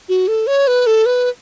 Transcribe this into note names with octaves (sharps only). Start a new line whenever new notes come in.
F#4
A4
C#5
B4
A4
B4